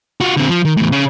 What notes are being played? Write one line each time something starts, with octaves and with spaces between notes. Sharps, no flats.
F4 F#4
D3 C4
F3
D#3
E2 A2
C#3